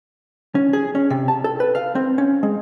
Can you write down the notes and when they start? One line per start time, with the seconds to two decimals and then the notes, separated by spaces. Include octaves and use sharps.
0.55 C#4
0.73 G#4
0.95 C#4
1.10 C3
1.28 A5
1.44 A4
1.60 B4
1.75 F5
1.95 C4
2.18 C#4
2.43 G#3